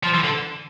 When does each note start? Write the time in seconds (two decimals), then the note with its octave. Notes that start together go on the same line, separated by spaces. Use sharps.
0.03 F3
0.14 E3
0.24 D3